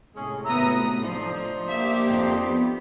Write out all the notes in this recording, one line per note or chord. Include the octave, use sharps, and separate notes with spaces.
A2 C3 G#3 A3 C#4 G#4
G#1 B3 E5 A#5 D#6
F3 D4 D#4 C5
A#3 G4 E5
F2
B3